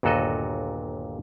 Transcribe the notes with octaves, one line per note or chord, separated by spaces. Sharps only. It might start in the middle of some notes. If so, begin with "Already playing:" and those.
G1 D#2 A#2 F#4 A4 D#5